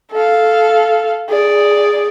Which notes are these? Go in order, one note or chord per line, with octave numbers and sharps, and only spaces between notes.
A4 F5
G#4 D5